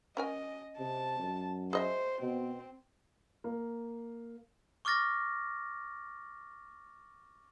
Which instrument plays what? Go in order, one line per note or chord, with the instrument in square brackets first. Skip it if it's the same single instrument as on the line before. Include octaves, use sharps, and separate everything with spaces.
[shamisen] C#4 A#4 G#5 [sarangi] D#5
[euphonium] C3 [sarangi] A5
[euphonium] F#2
[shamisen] G#4 D#5 E5 [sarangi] C5
[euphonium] B2 [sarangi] C4
[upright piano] A#3
[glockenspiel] C#6 D6 F6 A6 A#6